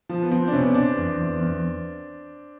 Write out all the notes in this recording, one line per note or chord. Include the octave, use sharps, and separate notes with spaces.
F3
B3
F3 C4
D4
C3 B3 C#4
C3 C4 D4
E2
E2
E2